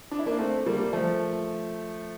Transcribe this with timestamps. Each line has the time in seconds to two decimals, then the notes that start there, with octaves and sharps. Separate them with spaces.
0.11 D4
0.19 E4
0.26 A#3 D4
0.39 A3 C4
0.66 G3 A#3
0.93 F3 A3